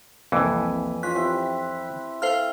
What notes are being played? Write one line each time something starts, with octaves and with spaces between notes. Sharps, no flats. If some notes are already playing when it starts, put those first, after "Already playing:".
C2 F2 E3 A#3 B4 E5 G#5 D#6
C#4 F4 D#5 F#6 B6
C4 E4 G4
A4 C5 F5 F6